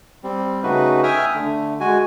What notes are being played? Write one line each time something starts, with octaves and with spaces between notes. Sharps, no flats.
G3 C4
C#3 A3 D#4 F#4 B4
E5 G5 G#5 D#6 F6
D3 A3
G#3 F#4 G#5